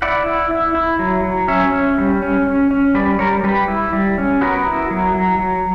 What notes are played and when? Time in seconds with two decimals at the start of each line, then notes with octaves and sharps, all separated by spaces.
0.02 E4 D5 F#5
0.26 E4
0.51 E4
0.75 E4
0.99 F#3
1.24 F#3
1.48 C#4 C#5 E5
1.73 C#4
1.98 G3
2.22 C#4
2.47 C#4
2.71 C#4
2.95 G3 B4 D5
3.19 G3 A#4 C#5
3.44 G3 G4 B4
3.68 E4
3.93 G3
4.18 C#4
4.41 B3 F#4 A#4
4.67 E4
4.91 F#3
5.14 F#3
5.39 F#3